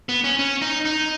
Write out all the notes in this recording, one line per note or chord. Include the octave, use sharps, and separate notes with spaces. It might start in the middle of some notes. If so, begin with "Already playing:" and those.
B3
C#4
C#4
D#4
D#4